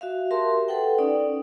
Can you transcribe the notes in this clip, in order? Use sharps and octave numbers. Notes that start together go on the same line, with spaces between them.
F#4 E5 F5
G4 A#4 E5 A5 C6
A4 B4 F#5 G5
C#4 D#4 D5